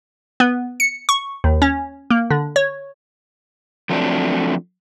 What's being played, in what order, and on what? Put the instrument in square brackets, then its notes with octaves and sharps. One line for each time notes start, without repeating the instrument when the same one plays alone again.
[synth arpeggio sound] B3
C#7
C#6
D#2
C#4
A#3
D3
C#5
[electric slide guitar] F3 F#3 A3 C4 D4